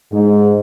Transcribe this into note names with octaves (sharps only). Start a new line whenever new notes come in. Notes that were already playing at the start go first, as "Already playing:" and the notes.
G#2